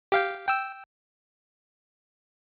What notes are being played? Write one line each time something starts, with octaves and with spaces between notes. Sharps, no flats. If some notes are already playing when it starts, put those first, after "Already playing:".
G4 F5 G5
G5 E6